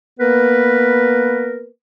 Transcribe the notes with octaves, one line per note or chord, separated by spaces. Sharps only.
A#3 B3 A#4 B4